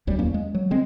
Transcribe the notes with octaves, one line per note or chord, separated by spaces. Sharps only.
D#1 D2 F#3 G3
D1 E2 A#3 C#4
G#3
F#3
D3 G3 G#3 C4